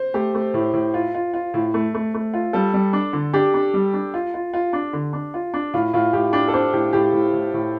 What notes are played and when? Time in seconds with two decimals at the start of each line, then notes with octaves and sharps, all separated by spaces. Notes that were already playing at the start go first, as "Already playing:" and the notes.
Already playing: C5
0.14 A3 G4
0.35 A3
0.54 A2
0.73 A2
0.94 F4
1.15 F4
1.34 F4
1.54 A2
1.74 A3
1.94 A3
2.14 A3
2.34 F4
2.53 G3 A4
2.74 G3
2.93 D4
3.13 D3
3.33 D4 G4
3.54 D4
3.74 G3
3.94 D4
4.14 F4
4.34 F4
4.54 F4
4.73 D4
4.93 D3
5.13 D4
5.34 F4
5.54 D4
5.74 A2 F4
5.93 A2 F4
6.13 A2 G4
6.33 D4 G4
6.48 A4
6.53 D4 C5
6.73 A2 G4
6.93 A2 G4
7.13 A2
7.33 A2
7.54 A2